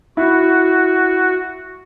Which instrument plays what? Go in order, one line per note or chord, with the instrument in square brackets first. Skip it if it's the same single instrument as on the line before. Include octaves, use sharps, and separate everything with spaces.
[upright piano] E4 [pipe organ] F#4